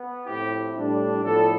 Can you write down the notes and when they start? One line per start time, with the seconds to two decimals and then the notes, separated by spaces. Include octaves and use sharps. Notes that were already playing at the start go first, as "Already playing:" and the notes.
Already playing: B3
0.25 A2 F3 C4 E4 G4
0.74 A2 G3 D4
1.22 A2 F3 B3 D4 A4